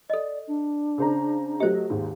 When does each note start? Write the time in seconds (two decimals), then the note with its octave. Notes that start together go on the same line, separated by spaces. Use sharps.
0.10 A4 D5 D#5
0.47 D4
0.98 C#3 C5 A#5
1.60 F#3 A3 G4 C5 D#5
1.90 G#1 D#2 G#2